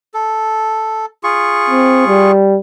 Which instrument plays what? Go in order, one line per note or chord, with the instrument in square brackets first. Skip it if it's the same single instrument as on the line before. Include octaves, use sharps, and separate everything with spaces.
[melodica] A4
F4 G#4 C#6
[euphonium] C4
G3